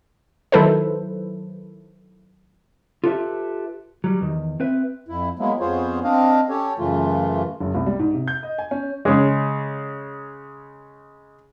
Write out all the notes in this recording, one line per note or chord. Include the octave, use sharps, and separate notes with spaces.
D#3 F#3 E4 A4 B4 C5
F4 G4 A4 B4 D#5 E5
F#3 G3
E2 D#3
C4 B4 E5
F2 E4
F#3 G#3 A#3 B3 E4
F2 B3 F4 G#4 C5 C#5
C4 D4 D#5 F5
C#4 G4 A4 C#5
F#2 C#3 E3 A3 F4
F#1
C2
G3
G#2
C3
G6
D#5
G#5
C#4
C#3 G#3